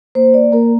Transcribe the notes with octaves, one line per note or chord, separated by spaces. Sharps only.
A#3 C5
D5
A#3 A#4